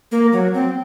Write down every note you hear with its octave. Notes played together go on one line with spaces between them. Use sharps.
A#3
F#3
C4